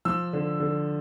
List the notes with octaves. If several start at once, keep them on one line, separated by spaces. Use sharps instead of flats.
F3 E6
D3
D3